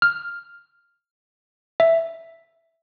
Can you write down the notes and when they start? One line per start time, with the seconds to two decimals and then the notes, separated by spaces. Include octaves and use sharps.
0.02 F6
1.80 E5